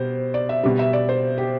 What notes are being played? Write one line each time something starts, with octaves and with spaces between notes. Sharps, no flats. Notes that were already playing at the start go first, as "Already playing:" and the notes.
Already playing: B2 G3 C5
D5
E5
B2 G3
E5
D5
C5
G4